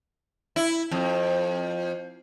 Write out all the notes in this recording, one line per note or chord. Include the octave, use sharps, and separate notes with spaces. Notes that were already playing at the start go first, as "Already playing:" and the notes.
E4
F2